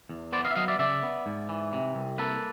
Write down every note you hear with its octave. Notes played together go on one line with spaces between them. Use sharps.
E2
B3 C5 D5
D#5 F5
E5
F#3 D#5 F5
D5 E5
C#3 D5 E5
B3
G#2
E3
C3
C2
A#3 A4 B4